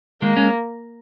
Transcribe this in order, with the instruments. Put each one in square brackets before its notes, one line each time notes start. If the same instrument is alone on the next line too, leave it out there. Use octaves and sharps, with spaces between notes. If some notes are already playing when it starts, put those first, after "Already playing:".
[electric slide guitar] D#3 G#3 [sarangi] A#3
[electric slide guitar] G#3 C#4